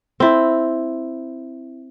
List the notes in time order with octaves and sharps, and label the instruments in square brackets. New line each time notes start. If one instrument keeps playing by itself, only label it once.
[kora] C4 E4